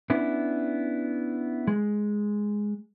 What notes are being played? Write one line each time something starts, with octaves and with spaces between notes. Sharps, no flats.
B3 C#4 D4 E4
G#3